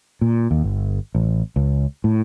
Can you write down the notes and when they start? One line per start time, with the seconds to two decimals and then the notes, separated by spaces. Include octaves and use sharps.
0.21 A#2
0.51 D#2
0.64 G1
1.15 A1
1.56 C#2
2.04 A2